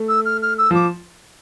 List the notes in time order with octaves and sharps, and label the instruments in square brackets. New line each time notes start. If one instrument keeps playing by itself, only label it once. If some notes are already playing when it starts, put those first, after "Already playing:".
Already playing: [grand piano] A3
[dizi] E6
F6
F6
E6
[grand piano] F3 [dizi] D6